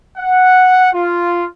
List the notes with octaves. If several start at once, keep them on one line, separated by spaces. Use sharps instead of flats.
F#5
F4